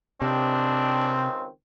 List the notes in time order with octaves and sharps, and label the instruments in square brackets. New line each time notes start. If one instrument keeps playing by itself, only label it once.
[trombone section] C#2 D#3 C4 [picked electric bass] C3 [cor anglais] D4